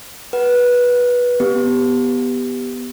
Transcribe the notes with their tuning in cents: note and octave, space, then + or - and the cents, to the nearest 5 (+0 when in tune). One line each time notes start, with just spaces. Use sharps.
B4 -15 F#5 +15
B3 +0 G4 +0